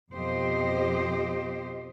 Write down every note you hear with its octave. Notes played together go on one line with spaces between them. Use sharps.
F2 B2 F3 G4 C5 D#5